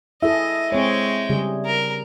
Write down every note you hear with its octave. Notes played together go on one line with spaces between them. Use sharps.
E4 G#4 A4 D#5 E5
G#3 C4 C#5 G5
C#3 G3 G#4
A#4